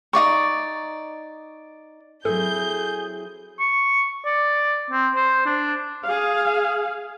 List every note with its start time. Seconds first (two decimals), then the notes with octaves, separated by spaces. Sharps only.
0.13 D#4 F4 D5 C#6
2.25 F#3 C4 E4 G#4 A4 G6
3.60 C#6
4.25 D5
4.90 C4
5.16 C5
5.46 D4
6.04 G#4 F5